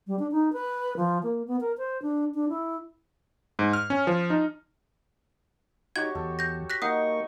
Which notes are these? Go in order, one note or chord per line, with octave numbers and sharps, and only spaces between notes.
G3
D4
D#4
B4
F3
A#3
B3
A#4
C5
D4
D4
E4
G#2
F6
C#4
F3
D#4
D#4 F#4 G4 C#5 G#6
E2 A4
G6 A#6
F#6 A#6 B6
A#3 D#4 D#5 F#5 C#6 D#6